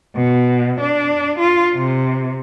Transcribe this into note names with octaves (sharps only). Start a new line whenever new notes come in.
B2
D4
F4
C3